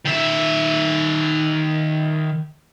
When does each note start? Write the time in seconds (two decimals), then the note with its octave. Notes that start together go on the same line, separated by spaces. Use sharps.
0.05 D#3 E5